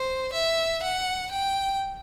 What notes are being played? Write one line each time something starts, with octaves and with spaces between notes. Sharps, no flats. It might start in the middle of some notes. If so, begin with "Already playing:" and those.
Already playing: C5
E5
F#5
G5